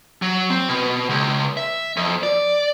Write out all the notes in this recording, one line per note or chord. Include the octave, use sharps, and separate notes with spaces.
F#3
C4
B2
C#2
E5
F2
D5